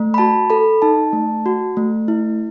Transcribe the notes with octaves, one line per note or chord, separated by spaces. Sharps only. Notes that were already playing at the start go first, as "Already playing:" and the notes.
Already playing: A3
B5
F#4 A5
A4 B5
D#4 A5
A3
F#4
A3
E4